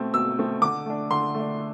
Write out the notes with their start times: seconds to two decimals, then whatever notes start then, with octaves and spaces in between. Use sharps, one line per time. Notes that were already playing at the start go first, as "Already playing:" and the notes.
Already playing: B2 A3 C4
0.14 B2 E6
0.39 A3 C4
0.62 D3 D6
0.86 A3 D4
1.10 D3 C6
1.35 A3 D4